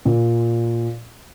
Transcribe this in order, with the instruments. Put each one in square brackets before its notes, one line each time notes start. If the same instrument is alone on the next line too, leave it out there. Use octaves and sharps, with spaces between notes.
[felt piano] A#2